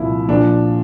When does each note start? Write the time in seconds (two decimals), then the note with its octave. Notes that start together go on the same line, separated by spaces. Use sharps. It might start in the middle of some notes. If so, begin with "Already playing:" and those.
Already playing: C2 A#2 F3 E4
0.28 A#1 A#2 F3 D4